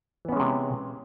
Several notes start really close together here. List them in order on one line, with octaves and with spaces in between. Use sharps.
E3 B3 C#4 G#3 C3